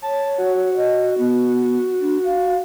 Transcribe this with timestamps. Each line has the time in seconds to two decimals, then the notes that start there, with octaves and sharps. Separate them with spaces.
0.02 C#5 A5
0.38 F#4
0.77 D#5
1.19 B3
2.01 D4
2.25 F5